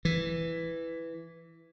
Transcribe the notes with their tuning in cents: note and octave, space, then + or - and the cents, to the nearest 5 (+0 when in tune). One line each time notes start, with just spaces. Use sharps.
E3 +5